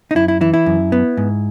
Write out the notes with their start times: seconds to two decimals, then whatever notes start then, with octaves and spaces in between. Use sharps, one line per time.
0.11 D#4
0.15 F#2 E4
0.28 E4
0.41 E3 E4
0.54 E4
0.66 F#2
0.92 B3
1.17 G#2